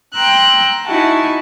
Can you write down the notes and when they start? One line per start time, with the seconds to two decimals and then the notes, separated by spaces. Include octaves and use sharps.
0.14 G5 A#5 C6 E6 F#6
0.86 D#4 E4 F#4 G#5 A5